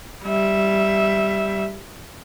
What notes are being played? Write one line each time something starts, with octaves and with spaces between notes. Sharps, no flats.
G3 E5